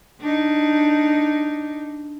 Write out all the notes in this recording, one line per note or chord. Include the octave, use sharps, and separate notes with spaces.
D4 D#4